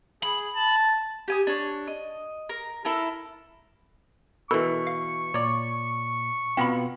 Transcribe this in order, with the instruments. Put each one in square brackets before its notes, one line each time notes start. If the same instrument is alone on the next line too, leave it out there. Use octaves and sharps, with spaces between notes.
[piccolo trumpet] G#4 [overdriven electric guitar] B5
[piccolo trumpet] A5
[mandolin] G4 G#5 D#6
D4 C#5
D#5
A#4
E4 A4 A#4
[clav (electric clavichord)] B2 E3 [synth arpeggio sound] E4 A4 A#4 [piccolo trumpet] C#6
[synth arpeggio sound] F5
[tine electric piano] A#2 [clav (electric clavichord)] C#5 D5
[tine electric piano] B2 B3 F4 [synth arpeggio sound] C4 A#5 B5